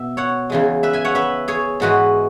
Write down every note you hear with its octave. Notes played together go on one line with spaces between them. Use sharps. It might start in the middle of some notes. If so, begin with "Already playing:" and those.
Already playing: B2 E5
C#5 F#5
E2 C#3 E3 G#3
B4 E5
E5 G#5
C#5 F#5
B4 E5
G#4 C#5
G#2 E3 G#3 F#4 B4